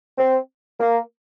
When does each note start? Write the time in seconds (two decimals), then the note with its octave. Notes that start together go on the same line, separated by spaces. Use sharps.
0.18 C4
0.80 A#3